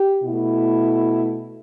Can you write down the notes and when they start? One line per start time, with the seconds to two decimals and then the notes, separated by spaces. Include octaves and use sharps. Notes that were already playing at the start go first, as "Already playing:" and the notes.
Already playing: G4
0.23 B2 A3 E4